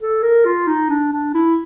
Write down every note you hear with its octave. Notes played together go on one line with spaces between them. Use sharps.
A4
A#4
F4
D#4
D4
D4
E4